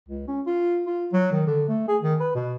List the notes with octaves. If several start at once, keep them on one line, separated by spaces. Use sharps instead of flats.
C#2
C#4
F4
F4
F#3
D#3
D3
A3
G#4
D#3
B4
B2